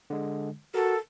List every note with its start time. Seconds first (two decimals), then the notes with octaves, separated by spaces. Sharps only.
0.10 D3 G#3
0.74 F#4 A4 A#4